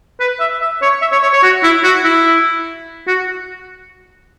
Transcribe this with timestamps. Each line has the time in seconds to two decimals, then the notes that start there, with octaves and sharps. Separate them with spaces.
0.20 B4
0.40 E5
0.62 E5
0.82 C#5
1.02 E5
1.12 C#5
1.23 C#5
1.33 C#5
1.43 F#4
1.64 E4
1.84 F#4
2.05 E4
3.07 F#4